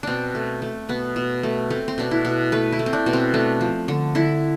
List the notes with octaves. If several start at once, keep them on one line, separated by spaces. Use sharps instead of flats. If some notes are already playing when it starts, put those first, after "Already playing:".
B2 C4 D4
A3
A3
B2 B3
B2
A3
A3 C4
C4
B2 D4
E4
B2
A3 B4
E4
A3
C4
D4
B2
C4
A3 D4
F3
D3
D3 E4